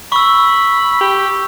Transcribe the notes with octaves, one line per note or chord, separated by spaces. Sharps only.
B5 C#6 E6
G4